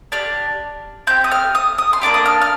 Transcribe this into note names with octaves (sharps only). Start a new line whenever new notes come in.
D4 G4 F6
C4 G4 G6
D#6
F6
D#6
D#6
C6
A#3 D4 G4 D6
D#6
F6
F6